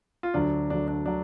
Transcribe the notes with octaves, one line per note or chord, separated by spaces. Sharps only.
F4
D2 D3 F#3 D4
D2 D3 F#3 D4
D4
D3 F#3 D4